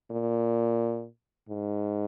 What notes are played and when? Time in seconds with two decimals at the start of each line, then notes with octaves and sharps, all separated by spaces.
0.11 A#2
1.49 G#2